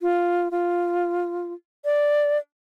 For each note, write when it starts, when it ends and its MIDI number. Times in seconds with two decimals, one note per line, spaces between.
0.01 0.48 65
0.51 1.53 65
1.85 2.38 74